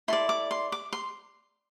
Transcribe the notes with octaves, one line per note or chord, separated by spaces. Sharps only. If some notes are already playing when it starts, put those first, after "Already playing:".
E4 A4 D5 C6
D6
C6
D6
C6